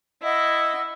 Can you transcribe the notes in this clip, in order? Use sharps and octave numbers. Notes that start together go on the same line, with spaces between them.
E4 D#5 F#5 E6